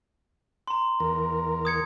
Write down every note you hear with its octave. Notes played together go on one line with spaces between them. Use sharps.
A#5 C6
E2 A#4
D#6 G#6 C#7